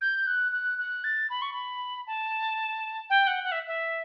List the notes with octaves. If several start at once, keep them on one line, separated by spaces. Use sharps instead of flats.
G6
F#6
F#6
F#6
A6
B5
C#6
B5
A5
G5
F#5
F#5
E5
E5